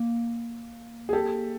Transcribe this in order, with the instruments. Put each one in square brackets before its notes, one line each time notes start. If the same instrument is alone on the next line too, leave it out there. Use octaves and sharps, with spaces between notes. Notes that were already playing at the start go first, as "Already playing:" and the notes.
Already playing: [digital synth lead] A#3
[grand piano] G#4
G4 A4